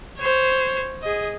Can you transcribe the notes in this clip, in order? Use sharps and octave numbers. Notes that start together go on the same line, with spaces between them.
C5 C#5
G#4 D#5